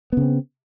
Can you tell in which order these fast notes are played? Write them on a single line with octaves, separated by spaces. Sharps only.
B3 C#3 C4